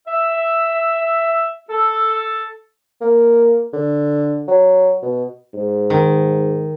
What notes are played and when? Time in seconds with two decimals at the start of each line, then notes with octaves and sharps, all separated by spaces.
0.07 E5
1.70 A4
3.01 A#3
3.73 D3
4.48 F#3
5.02 B2
5.54 G#2
5.90 D#3